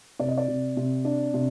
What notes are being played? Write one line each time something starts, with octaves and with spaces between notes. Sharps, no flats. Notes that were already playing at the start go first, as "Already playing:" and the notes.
C3 D5
D#5
D5
C3
C3
D4
C3